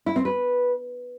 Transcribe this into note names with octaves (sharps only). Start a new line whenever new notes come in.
E4
C4
B4